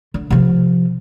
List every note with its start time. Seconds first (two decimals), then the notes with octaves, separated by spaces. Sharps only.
0.14 D3
0.30 C3 F3